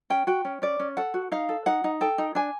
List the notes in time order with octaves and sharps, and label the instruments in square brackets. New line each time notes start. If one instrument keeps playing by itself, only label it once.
[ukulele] C#4 G5
F#4 G5
C#4
C#4 D5
C#4
A4 F#5
F#4
D#4 F5
A4
D#4 F#5
D#4
A4 G5
D#4
D4 G#5